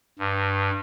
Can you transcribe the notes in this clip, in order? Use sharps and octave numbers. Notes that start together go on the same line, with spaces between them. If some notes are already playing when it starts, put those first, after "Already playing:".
G2